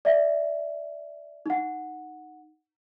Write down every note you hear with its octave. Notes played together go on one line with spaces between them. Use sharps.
D5 E5
D#4 F#5